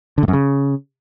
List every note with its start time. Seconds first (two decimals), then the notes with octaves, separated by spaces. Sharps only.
0.18 D3
0.23 A2
0.28 F#2
0.33 C#3